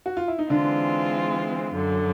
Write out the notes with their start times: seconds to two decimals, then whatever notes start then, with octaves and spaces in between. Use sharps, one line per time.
0.06 F#4
0.17 F4
0.28 E4
0.38 D#4
0.50 D3 E3 G#3 C4 D4 F4
1.73 F#2 D3 F#3